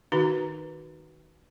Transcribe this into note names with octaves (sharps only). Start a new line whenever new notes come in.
D#3 D#4 F#4 B4 A#5